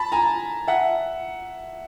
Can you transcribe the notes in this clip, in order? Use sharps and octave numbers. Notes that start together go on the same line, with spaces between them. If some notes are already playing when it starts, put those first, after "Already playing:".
Already playing: A5 B5
G#5 A#5
E5 F#5